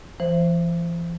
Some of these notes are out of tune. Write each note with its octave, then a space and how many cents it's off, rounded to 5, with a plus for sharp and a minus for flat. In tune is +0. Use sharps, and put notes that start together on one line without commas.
E3 +45 C5 +0